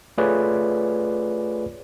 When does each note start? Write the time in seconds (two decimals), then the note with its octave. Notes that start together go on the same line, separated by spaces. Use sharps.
0.18 A3 F4 G#4 B4 C#5 D5